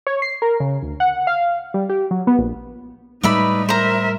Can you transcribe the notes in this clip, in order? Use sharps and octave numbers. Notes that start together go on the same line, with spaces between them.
C#5
C7
A#4
C#3
D2
F#5
F5
G3
G4
F#3
B3
A#1
A2 G3 G#3 D#4 B4 D5 E5 B5
A#4 C5 E5 A#5